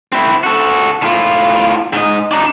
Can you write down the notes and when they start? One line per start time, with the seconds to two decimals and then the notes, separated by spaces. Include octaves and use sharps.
0.12 C4 E4
0.44 F#4 A4
1.02 A2 F4
1.93 G#2 D#5
2.32 D4 D#4